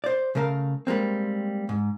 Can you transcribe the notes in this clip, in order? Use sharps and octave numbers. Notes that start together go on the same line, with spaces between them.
C5 D5
C#3 A3 A#4 D#5 F5
G3 G#3 A#3 C4
G#2